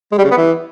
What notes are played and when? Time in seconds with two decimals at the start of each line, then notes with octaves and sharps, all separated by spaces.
0.12 G#3
0.18 G3
0.24 C#3
0.31 B3
0.37 E3